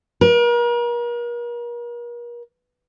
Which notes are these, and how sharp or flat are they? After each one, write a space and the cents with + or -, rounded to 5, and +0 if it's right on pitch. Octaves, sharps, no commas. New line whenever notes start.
A#4 +40